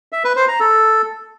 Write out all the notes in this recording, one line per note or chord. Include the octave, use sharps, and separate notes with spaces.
E5
B4
C5
A#5
A4